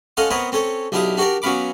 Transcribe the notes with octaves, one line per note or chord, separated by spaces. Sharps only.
C#4 A4 D#5 F5 F#5 C6
B3 C4 A#4 B4 C#5 D#5
C4 C#4 A4 C#5
B1 D4 E4 G4 F5 D#6
D4 F#4 G4 A#4 D5
F#3 B3 C#4 F5 B5 D6